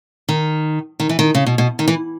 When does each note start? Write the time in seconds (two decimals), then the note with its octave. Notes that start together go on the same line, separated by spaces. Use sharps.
0.29 D#3
1.00 D#3
1.09 E3
1.19 D#3
1.35 C#3
1.46 B2
1.58 B2
1.79 D#3
1.88 E3